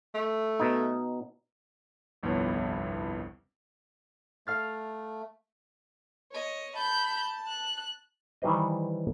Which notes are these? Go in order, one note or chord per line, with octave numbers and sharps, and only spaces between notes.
A3
B2 D#4
G1 C2 F2 B3 E4 C#5
A3 F5 F6 A6
C#5 D#5
A5 B5 G6
F#6
D#3 E3 G3 B4 C5 D#5